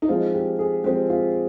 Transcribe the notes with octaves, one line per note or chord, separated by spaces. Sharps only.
D#4
F3 G#3 C4 F4
G4
G#4
F3 G#3 C4 G4
F4